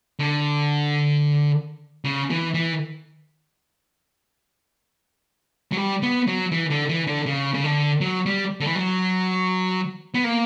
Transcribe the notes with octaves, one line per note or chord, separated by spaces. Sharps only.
D3
C#3
E3
E3
F#3
G3
B3
F#3
E3
D3
E3
D3
C#3
C#3
D3
F#3
G3
D3
E3
F#3
B3
A#3